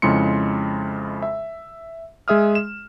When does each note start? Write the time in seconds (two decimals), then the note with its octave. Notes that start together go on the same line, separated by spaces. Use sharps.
0.02 F2 C#3 G#3 E4 C6 C#7
1.22 E5
2.28 G#3 G#4 E5 D#6 F6
2.55 E7